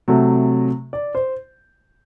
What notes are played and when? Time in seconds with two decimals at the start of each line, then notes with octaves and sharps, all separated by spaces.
0.08 C3 F#3 A3
0.93 D5
1.15 C5